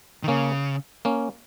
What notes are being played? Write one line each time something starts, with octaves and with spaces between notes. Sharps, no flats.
D#3
C#3 A#3 C#4
A#3 C#4